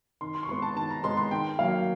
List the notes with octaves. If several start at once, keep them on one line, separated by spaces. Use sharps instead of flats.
D#3 C6
C6
C#6
G#3 B3 C6
A5
D#3 A5
A#5
G#3 B3 C6
C6
D#3 G5
F#3 A#3 F5